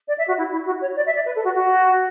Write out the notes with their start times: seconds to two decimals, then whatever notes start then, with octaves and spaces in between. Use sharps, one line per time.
0.08 D5
0.18 E5
0.28 F#4
0.38 E4
0.52 E4
0.66 F#4
0.81 C#5
0.96 D5
1.06 E5
1.15 D5
1.26 B4
1.36 A4
1.45 F#4
1.55 F#4